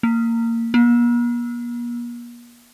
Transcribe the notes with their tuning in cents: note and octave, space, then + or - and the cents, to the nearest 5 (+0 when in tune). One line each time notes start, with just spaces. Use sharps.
A#3 -20
A#3 +45